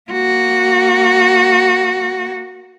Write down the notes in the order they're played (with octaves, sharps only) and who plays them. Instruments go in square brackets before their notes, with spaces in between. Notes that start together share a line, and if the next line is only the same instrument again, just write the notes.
[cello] A#3 F#4